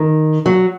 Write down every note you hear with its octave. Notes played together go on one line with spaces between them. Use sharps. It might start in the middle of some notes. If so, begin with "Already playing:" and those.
Already playing: D#3
F#3